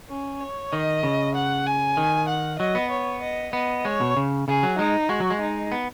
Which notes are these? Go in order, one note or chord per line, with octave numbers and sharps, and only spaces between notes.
C#4
C#5
D#3 D#5
C#3
F#5
G#5
D#3
F#5
F#3 D#5
B3
C#5
D#5
B3 D#5
G#3 C#5
B2
C#3
C#3 G#4
F#3
G#3 D#4
G#3 F#4
F#3
G#3
D#4
B3